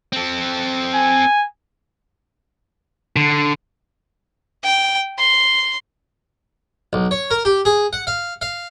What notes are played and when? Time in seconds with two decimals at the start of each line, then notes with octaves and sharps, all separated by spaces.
0.13 C4 A4
0.95 G#5
3.16 D3
4.63 G5
5.18 C6
6.93 B1
7.11 C#5
7.31 A#4
7.45 G4
7.65 G#4
7.93 F#5
8.07 F5
8.42 F5